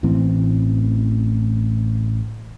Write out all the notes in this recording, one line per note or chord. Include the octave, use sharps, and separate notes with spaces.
A1 A2 E3 C4